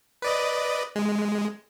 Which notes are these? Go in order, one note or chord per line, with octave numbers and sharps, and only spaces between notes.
B4 D5 D#5
G#3